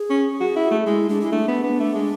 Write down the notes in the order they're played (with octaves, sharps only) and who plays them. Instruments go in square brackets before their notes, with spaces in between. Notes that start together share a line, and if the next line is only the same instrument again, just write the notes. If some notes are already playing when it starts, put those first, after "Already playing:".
Already playing: [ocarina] G#4
[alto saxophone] C#4
F#4
E4
A3
[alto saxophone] G#3 [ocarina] E4
[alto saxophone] G#3 [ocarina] D4
[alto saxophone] G#3 [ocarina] E4
[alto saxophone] A3 [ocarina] D4
[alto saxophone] B3
B3
A3
G#3